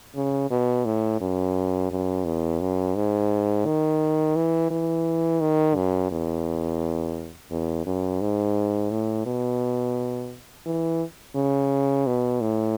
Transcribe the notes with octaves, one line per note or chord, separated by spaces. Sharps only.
C#3
B2
A2
F#2
F#2
E2
F#2
G#2
D#3
E3
E3
D#3
F#2
E2
E2
F#2
G#2
A2
B2
E3
C#3
B2
A2